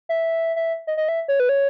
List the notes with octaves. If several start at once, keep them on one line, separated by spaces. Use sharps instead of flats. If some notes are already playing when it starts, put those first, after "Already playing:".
E5
E5
D#5
D#5
E5
C#5
B4
C#5